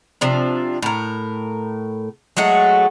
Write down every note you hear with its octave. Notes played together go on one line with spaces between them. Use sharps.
C3 F3 D4
A2 A#4
F#3 G#3 A3 F#4